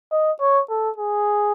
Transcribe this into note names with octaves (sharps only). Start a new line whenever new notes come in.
D#5
C#5
A4
G#4